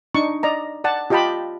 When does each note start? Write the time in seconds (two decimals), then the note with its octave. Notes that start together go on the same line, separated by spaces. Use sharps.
0.15 D4 D#4 C#6
0.43 D5 D#5 A#5
0.84 D5 F#5 A5
1.10 F4 G4 D#5 G5 A5 B5